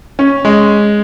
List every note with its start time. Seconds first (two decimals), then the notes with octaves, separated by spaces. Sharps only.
0.19 C#4
0.45 G#3